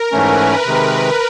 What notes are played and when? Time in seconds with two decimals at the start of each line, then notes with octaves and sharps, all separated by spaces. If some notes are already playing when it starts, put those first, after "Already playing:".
Already playing: A#4
0.12 G#2 E3 A3 C#4 B4
0.66 C3 D#3 G#3